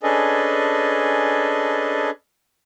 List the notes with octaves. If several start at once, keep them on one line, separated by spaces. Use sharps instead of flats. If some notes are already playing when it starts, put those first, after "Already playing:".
C#4 D4 G#4 A4 B4 D#5